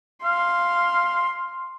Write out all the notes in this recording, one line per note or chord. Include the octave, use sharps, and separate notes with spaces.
F5 C6